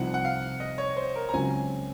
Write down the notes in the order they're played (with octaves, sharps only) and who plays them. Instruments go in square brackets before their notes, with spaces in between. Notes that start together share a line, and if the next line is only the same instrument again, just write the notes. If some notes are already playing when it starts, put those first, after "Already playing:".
Already playing: [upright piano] C2 C3 F3 C4 D#4 [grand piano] F#5
[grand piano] F#5
F5
D#5
C#5
C5
A#4
A#5
[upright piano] C#2 C#3 F#3 C4 [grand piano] G#5